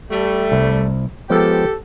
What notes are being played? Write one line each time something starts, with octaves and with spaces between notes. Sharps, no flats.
G3 A3
C2
F3 G#3 B3 G4 A4